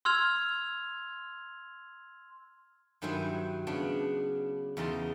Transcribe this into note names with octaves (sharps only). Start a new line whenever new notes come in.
C6 E6 F6 G#6 F7
G2 D#3 F#3 E4 C5 G#5
C#3 B3 D4
E2 C#3 D#4 A5 C6